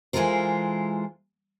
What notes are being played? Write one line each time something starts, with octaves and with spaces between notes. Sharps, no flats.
E3 G#3 F4 A4 A#4 C5